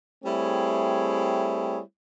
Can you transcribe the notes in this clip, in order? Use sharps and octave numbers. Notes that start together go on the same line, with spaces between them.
G3 A3 C4 E4 G#4 C#5